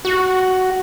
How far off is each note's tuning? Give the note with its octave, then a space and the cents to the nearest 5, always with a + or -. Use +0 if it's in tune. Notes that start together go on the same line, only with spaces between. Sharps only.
F#4 +10